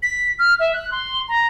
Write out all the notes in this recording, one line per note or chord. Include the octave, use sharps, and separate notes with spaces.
B6
F6
E5
F#6
C6
A#5